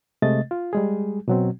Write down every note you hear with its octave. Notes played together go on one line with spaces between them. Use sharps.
C3 G#3 A3 D#5 A6
F4
G3 G#3 G#4
B2 F#3 C4